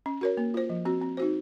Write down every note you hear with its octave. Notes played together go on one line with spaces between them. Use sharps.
C#4
F#4 A#4 C#5
A#3
F4 C5
F3
C4 F#4
C4
D#4 F#4 C5